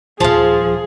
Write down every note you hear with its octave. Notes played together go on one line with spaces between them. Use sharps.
D#1 D2 F3 G#4 F5 A5